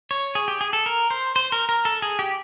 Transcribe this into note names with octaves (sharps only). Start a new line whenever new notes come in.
C#5
G#4
G4
G#4
A4
A#4
C5
C5
A#4
A#4
A4
G#4
G4